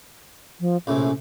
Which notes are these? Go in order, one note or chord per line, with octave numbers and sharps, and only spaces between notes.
F3
A#1 A2 C3 C#4